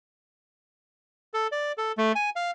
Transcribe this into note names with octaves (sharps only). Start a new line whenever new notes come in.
A4
D5
A4
A3
G#5
F5